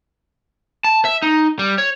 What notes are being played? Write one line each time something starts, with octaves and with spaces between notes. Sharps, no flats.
A5
E5
D#4
G3
C#5